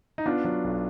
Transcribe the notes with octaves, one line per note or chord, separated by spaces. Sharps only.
D#4
B3 D4 F4
F#3
B1